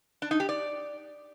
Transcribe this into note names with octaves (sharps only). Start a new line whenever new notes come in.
D4
D#4
G4
D5